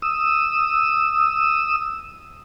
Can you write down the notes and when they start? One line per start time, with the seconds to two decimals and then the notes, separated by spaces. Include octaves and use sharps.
0.02 D#6 E6